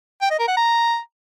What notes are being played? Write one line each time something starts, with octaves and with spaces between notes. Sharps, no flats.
G5
D#5
A#4
F#5
A#5